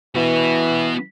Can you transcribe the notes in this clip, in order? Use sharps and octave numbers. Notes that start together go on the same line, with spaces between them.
E3 B3 F#4